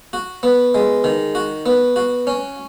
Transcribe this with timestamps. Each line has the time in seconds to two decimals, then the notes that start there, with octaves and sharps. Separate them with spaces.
0.13 F#4
0.43 B3
0.75 G#3
1.04 D#3
1.35 F#4
1.66 B3
1.96 F#4
2.27 C#4